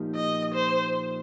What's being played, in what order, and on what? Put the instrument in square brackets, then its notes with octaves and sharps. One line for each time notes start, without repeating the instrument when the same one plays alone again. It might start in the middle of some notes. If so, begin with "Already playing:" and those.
Already playing: [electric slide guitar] A#2 F3 A#3 D#4 G4
[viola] D#5
C5